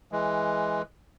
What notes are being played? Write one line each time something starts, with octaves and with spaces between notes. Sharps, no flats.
E3 G#3